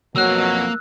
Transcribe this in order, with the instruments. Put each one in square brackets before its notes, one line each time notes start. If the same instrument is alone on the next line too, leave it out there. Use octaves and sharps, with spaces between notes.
[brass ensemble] F2 B2 F#3 [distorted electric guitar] A#3 [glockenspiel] E6 F#6